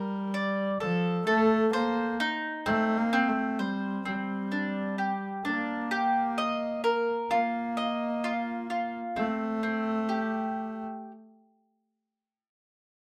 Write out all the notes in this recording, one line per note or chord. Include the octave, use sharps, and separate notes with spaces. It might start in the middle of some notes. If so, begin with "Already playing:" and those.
Already playing: G3 A#4
D5
F3 A4
A3 A4
A#3 C5
D#4
A3 C4
A#3
C4
A3
G3 C5
G3 C4
D4
G4
A#3 D4
G4
D#5
A#4
A#3 F4
D#5
F4
F4
A3 C4
C4
G4